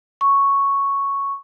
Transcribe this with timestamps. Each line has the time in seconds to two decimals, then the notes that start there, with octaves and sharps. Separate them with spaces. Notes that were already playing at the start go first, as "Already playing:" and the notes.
0.21 C#6